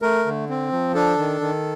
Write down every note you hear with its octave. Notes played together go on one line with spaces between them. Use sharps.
A3 A#4
D3
C4
F3
D4 A4
D#3
D#3